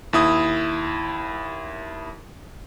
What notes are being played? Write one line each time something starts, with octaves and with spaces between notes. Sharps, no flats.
D#2 E4 D#6